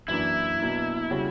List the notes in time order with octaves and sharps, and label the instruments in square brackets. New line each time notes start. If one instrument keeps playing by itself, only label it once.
[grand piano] F#2 E3 A#3 D4 [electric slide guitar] E4
[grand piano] B2 F#3 A#3 D4
C#3 G3 C#4 F#4